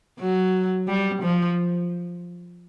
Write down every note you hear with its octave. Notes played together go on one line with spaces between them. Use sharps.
F#3
G3
F3